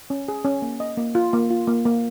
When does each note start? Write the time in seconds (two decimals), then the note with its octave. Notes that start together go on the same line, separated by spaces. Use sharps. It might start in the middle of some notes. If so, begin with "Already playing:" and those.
0.10 C#4
0.28 G#4
0.45 C#4
0.62 A#3
0.80 D#5
0.97 A#3
1.15 F4
1.33 A#3
1.51 F4
1.67 A#3
1.85 A#3